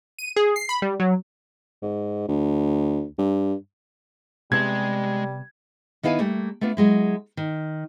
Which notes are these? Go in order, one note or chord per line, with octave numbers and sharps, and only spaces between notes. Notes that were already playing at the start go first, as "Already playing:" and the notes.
D#7
G#4
C7
B5
G3
F#3
G#2
D2
G2
C3 G3 G#3 B3 A5 C6 G#6
D#3 B3 E4 F5 G#5
G3 A3 A#3
A3 B3 D4 F4
F#3 G#3 E4
D#3